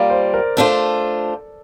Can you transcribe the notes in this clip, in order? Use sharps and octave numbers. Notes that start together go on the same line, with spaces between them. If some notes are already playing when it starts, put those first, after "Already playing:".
Already playing: G3 A#3 F4 D5
C5
A#4
A3 D4 F4 A4 C5